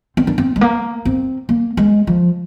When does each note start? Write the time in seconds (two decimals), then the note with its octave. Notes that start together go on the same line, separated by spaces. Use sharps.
0.17 C4
0.27 D4
0.38 C4
0.56 G#3
0.61 A#3
1.05 C4
1.49 A#3
1.77 G#3
2.07 F3